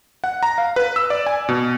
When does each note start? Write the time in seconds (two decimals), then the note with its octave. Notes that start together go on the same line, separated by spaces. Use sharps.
0.24 F#5
0.43 A#5
0.58 F5
0.76 B4
0.96 E6
1.10 D5
1.27 G#5
1.49 B2